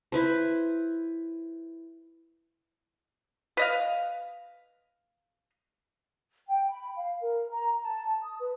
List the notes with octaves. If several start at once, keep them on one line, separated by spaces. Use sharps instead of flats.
E4 B4 C5
B4 D#5 F5
G5
B5
F5
A#4
A#5
A5
D#6
B4